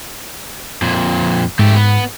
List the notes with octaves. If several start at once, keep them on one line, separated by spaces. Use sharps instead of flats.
F2 A#2
G#2 A3 G4
B3